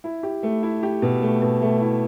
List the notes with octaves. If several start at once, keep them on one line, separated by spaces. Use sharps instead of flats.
E4
G4
A3
E4
G4
B2
A3
B2
A3
E4